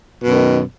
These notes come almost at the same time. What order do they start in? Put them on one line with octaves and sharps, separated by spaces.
B2 F#2 D#3